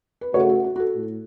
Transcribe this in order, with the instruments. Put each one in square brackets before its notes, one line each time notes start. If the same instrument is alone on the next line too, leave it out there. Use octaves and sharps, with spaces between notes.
[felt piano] B4
[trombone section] C#3 A3 F#4 [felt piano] C#5
[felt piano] A4
F#4
F#4
A4
[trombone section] A2